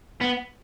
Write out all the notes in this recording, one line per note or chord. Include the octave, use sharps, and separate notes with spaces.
B3